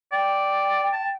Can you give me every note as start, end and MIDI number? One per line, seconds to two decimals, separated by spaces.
0.12 0.87 74
0.12 1.16 79
0.93 1.08 81